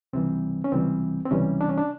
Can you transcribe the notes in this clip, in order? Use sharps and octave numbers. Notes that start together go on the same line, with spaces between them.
C#2 C3 E3 G3 C4
C#4
C#2 C3 E3 G3 C4
C4
C#2 C3 E3 G3 C#4
D4
C#4
D4